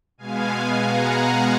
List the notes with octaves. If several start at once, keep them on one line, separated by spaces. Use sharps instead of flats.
B2 G#3 B3 F5 G#5
F#5 A#5